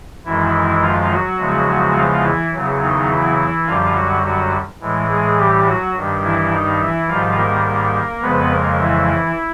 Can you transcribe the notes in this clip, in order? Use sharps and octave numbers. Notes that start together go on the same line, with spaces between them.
F#2 D#3 E3 G#3 E4
F3 F4
F#3 F#4
E2 C#3 F3 G#3
F3 F4
E3 E4
E2 C#3 F#3
D#3 D#4
E3 E4
F#2 D3 F3 G3 F4
F#3 F#4
F#3 F#4
A2 E3 G#3
G#3 G#4
G3 G4
F#3 F#4
G2 D#3 G3
E3 E4
D#3 D#4
E3 E4
G#2 D#3 F3 G3 F4
A#3 A#4
A#3 A#4
F2 C#3 F3 G#3 B3 B4
A#3 A#4
E3 E4